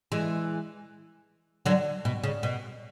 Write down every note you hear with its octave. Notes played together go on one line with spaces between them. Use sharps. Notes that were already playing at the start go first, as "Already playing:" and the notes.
E3 G#3
D3 F#3
B2
C#3
B2